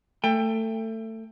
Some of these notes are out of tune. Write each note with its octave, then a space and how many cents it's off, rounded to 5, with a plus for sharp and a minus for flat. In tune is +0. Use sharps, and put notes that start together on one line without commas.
A3 +20 G5 +20